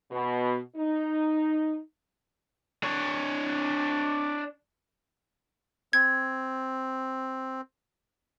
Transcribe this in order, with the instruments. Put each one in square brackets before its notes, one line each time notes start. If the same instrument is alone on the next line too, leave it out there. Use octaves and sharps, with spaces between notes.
[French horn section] B2
D#4
[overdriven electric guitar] D4 C#5
[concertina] C4 [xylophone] G#6